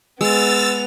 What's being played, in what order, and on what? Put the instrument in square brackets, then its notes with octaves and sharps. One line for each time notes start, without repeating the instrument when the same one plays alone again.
[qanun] G#3 [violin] B3 F7 [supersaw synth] E6 A6